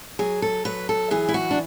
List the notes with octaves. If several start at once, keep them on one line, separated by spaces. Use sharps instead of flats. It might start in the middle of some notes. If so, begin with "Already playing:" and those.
F#3 G#4
A4
F#3 B4
A4
E3 G#4
E4
F#4
D4